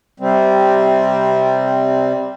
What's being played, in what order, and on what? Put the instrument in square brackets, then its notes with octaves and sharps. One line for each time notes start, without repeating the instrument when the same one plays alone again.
[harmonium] C3 G3 C4